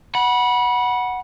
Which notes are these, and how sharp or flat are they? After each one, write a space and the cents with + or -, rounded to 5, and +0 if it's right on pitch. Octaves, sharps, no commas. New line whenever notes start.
F#5 +0 B5 -25